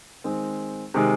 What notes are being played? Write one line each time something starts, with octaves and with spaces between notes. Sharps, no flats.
D#3 G#3 C4
C3 D#3 G#3